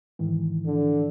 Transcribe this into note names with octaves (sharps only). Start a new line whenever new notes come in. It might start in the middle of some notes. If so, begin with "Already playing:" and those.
G#2 D#3 E3
D3